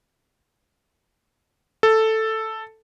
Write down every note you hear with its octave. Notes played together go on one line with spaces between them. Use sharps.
A4